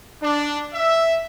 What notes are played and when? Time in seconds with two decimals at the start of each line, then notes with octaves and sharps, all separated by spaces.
0.22 D4
0.74 E5